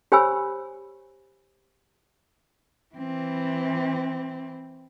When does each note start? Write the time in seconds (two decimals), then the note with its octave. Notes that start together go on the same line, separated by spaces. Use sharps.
0.12 G4 C5 C#5 G#5 B5 E6
2.95 E3 C4